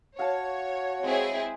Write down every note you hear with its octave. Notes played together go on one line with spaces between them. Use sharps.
F#4 C#5 F5 A5
G#3 C4 E4 G#4